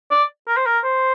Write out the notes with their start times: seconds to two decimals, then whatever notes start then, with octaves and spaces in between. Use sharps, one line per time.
0.11 D5
0.48 A#4
0.57 C5
0.66 A#4
0.84 C5